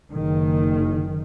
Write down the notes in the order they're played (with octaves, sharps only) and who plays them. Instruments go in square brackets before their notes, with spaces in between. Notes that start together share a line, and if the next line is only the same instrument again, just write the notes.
[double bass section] F#1 D#3